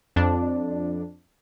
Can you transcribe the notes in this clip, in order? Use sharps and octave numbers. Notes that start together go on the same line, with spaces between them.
F2 D4